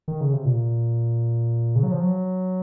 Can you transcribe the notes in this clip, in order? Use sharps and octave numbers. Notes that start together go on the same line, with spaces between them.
D#3
C#3
C3
A#2
C#3
F#3
F3
F#3